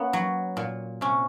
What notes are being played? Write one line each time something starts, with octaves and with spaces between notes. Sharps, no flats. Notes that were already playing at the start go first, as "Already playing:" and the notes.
Already playing: A#3 B3 C#4
F#3
A#2
C3 C#4